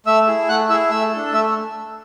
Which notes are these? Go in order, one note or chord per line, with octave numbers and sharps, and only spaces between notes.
A3 E5 E6
E4 G#4
A3 F#5 F#6
E4 G#4 E5 E6
A3 E5 E6
D4 A4
A3 E5 E6